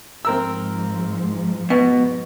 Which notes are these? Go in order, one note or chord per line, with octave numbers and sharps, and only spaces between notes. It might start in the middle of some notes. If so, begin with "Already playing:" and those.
G#2 F3 C4 A#4 E6
B2 B4